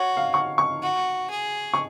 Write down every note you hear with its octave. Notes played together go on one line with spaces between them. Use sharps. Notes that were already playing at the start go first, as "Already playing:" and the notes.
Already playing: F#4 C#5
F5
C#6
C#6
F#4
G#4
C#6